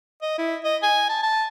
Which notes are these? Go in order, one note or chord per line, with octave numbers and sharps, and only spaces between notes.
D#5
E4
D#5
G#5
A5
A5